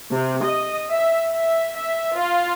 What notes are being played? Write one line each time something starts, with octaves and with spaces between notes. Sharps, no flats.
C3
D#5
E5
E5
E5
F4